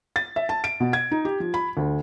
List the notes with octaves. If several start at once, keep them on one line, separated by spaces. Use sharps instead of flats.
A6
E5
A5
D7
B2
G#6
D#4
G4
F3
B5
D2